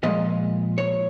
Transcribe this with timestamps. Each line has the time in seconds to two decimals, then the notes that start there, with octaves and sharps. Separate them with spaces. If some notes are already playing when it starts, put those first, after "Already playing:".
0.03 A#2 F3 G#3 D#5
0.78 C#5